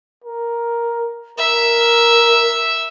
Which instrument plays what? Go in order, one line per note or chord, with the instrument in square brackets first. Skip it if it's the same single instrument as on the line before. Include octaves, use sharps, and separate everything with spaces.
[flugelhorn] A#4
[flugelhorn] A#4 [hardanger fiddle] E5